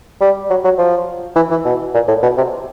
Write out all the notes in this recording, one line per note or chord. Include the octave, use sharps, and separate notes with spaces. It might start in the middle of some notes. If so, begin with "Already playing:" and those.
G3
F#3
F#3
F3
E3
E3
B2
A#2
A2
B2
C3